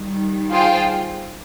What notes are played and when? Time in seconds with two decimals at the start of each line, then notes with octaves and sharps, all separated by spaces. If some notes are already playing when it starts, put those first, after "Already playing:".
Already playing: D#3 G3
0.51 F4 G#4 C5 G5